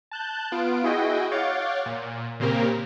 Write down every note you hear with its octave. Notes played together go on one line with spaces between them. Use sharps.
A5 F#6 G6
B3 F4 D7
E4 F#4 G#4 D#5 G5
C#5 F5 F#5 D6 G6 A6
A#2
A#2 C#3 A#3 C4 G4 A#4